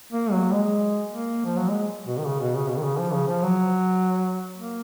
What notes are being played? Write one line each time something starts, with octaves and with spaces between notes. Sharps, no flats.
A#3
F#3
G#3
A#3
F3
F#3
G#3
B2
D#3
C#3
B2
C#3
B2
D#3
C#3
F3
C#3
F3
F#3
A#3